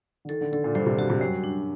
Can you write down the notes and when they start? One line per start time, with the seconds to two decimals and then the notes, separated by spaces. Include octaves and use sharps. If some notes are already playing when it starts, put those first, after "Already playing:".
0.25 D3
0.29 D#3 A4
0.41 D3
0.52 D3 A4
0.64 A#2
0.75 G2 C5
0.86 C3
0.98 D3 F#4
1.10 C3
1.20 F#2 G3
1.44 D4